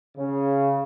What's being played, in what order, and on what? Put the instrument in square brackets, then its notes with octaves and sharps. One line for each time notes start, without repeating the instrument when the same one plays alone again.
[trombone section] C#3